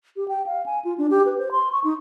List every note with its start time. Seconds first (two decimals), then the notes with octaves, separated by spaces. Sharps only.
0.16 G4
0.28 G5
0.47 F5
0.66 G#5
0.85 F4
0.98 D4
1.11 G4
1.26 B4
1.38 C5
1.52 C6
1.72 C#6
1.84 D#4